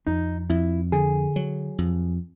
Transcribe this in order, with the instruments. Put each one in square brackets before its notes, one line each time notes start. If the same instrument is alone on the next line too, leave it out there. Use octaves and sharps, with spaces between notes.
[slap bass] F2 [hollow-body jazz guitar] D#4
[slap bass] F2 [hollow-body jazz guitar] E4
[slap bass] D3 [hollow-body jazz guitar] G#4
[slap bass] F#3
F2